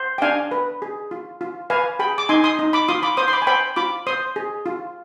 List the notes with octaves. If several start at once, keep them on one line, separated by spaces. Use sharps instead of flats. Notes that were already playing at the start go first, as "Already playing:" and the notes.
Already playing: C5
G5
D4 F5 G#5
B4
G#4
F4
F4
B4 F5 G#5
G#4 G5 B5
D6
D#4 G#5 C6
C6 D#6
D#4
B5 D6
F4 C6 D#6
B5 D6
C5 C6 D#6
C6
B5 D6
G#5
C5 G5 B5
F4 B5 D6
C5 C6 D#6
G#4
F4